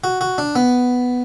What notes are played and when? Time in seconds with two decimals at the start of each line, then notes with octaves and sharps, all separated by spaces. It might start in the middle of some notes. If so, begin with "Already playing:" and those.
0.04 F#4
0.21 F#4
0.38 D4
0.56 B3